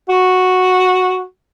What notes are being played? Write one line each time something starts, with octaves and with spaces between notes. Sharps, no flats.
F#4